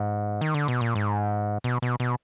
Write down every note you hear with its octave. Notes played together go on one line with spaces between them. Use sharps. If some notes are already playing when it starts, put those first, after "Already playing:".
Already playing: G#2
D#3
D3
B2
A#2
G#2
B2
B2
B2